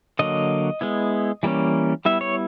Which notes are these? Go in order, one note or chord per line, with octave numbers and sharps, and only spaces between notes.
D3 F#3 A#3 D#5
G#3 B3 E4
E3 G3 A#3 C#4
G3 B3 E4 E5
C#5